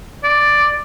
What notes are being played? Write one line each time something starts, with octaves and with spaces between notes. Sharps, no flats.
D5